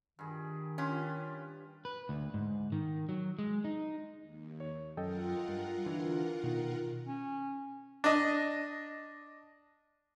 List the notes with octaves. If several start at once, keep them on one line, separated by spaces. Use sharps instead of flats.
G2 D#3 G#4
C#4 F4 G4 B4
B4
D2
G#2
D#3
F#3
G#3
D#4
D#2
C#5
F#2 F4 A4 A#4 D#5 F#5 G5
G2
D3 E3
B2 D#3
C#4
D4 D#5